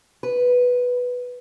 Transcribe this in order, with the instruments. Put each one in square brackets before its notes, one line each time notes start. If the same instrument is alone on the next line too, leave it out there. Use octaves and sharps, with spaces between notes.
[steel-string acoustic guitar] B4